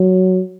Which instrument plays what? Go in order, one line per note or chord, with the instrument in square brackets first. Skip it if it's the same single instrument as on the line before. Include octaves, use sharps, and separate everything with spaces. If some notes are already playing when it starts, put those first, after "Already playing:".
Already playing: [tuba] F#3